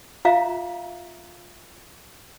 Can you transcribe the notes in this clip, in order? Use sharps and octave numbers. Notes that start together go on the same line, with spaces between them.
F4 E5 F5 A#5